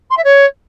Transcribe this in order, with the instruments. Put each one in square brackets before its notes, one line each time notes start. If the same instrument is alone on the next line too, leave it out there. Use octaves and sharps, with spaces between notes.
[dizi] C6
E5
C#5